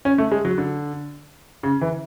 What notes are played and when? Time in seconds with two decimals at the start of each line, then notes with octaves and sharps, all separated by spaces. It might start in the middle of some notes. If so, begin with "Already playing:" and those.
0.05 C#4
0.18 A3
0.31 G#3
0.45 F#3
0.58 D3
1.63 C#3
1.81 E3